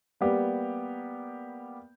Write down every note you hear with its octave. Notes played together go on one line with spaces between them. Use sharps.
G3 A#3 B3 G4